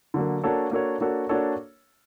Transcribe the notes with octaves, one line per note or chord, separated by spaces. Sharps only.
D3 F#3 A#3
A#3 D4 F#4 A4 C#5
A#3 D4 F#4 A4 C#5
A#3 D4 F#4 A4 C#5
A#3 D4 F#4 A4 C#5